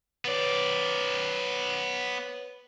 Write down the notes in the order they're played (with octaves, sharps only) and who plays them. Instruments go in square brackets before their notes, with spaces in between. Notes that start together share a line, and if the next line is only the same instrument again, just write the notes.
[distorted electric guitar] B3 D5 [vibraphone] B4 C#5